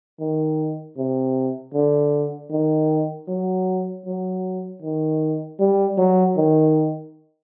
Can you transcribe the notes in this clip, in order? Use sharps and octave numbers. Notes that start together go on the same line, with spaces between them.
D#3
C3
D3
D#3
F#3
F#3
D#3
G3
F#3
D#3